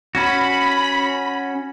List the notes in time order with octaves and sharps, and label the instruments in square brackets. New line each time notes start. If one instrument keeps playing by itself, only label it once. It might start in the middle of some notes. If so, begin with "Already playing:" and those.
[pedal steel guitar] C#4 F#4 [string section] B5